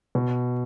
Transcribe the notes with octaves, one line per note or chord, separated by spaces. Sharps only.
B2